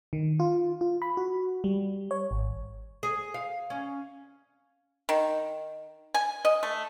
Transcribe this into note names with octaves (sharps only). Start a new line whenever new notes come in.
D#3
F4
F4
B5
F#4
G3
C#5
G#1
G#4
F5
C#4
D#3
G#5
D#5
A3